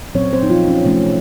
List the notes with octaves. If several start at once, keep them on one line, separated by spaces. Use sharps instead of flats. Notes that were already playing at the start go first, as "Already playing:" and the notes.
A#2 F#3 C4 C#4 C#5
C4 C5
D#4
F3 F4
C#4
C3 F3 A3 C#4